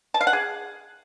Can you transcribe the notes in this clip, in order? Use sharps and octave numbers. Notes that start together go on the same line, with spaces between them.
A5
F5
F#5
G#4